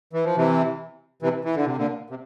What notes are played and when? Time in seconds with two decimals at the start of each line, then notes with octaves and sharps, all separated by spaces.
0.13 E3
0.24 F3
0.36 C3 E3
1.22 C3 E3
1.45 E3
1.55 D3
1.66 C3
1.76 A#2 D3
2.10 C3